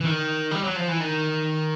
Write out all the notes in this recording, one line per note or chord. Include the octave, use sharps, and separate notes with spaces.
E3
D#3
G3
F#3
F3
E3
D#3